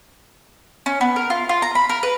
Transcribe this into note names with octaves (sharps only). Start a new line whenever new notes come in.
C#4
B3
A#4
F4
F4
A#5
B5
A#4
B4